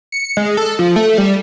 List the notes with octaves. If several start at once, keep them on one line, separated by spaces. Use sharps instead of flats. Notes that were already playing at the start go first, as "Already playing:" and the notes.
C#7
G#3
A4
F3
A3
G3